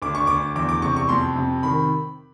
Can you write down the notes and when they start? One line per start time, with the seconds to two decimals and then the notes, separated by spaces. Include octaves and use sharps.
0.02 D2 D6
0.15 C#6
0.27 D2 D6
0.56 E2 D6
0.69 D6
0.82 C3 C#6
0.96 C#6
1.09 F2 C6
1.36 C3
1.63 D#3 B5